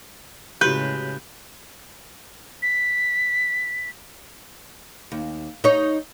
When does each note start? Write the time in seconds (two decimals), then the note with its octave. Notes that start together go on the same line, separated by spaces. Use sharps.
0.61 A2 C#3 G#3 E4 F#4 G4 B4 G6
2.62 B6
5.12 D#2
5.64 D#4 C#5